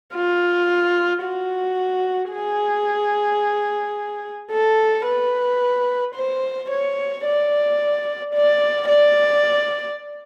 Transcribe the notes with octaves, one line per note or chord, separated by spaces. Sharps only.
F4
F#4
G#4
A4
B4
C5
C#5
D5
D5
D5